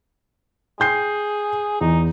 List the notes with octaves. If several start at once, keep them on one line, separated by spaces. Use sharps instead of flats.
G#4 G5 G6 C7
E2 D#4